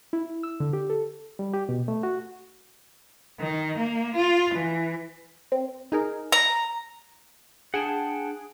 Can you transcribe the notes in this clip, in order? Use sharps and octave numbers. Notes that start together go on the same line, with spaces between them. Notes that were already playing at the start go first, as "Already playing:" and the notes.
E4
E6
D3
G4
A4
G3
G4
B2
A3
F#4
D#3
A#3
F4
E3
C4
D#4 G#4 A#4
A#5
D4 G#4 F#5 G5 A5